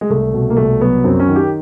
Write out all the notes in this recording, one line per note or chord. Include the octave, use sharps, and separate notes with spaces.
G#3
C2 A3
B2
A#3
C2 A3
F#3 B3
F#2 C4
C#4
D#3
G4